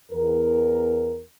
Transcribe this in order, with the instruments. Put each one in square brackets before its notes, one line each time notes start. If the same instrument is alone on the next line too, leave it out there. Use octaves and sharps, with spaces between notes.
[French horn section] E2 A#4